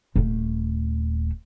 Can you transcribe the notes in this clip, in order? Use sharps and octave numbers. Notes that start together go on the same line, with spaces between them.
D#1 A3